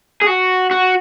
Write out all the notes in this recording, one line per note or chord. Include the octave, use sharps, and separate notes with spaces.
G#4
F#4
F#4